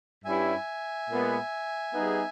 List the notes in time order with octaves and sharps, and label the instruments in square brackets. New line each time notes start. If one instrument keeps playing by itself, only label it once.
[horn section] G2 G3 C#4 E4 [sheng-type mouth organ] E5 G#5
[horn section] A#2 G#3 B3
G3 B3 D#4 G#4